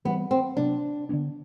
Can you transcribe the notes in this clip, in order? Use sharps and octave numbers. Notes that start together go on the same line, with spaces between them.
E3 G3 B3 C4
C4
C3 F#3 B3 D4
D3 F#3 B3 D4